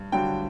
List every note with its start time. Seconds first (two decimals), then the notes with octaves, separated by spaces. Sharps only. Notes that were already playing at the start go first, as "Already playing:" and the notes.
Already playing: G2
0.12 G2 D3 F#3 G5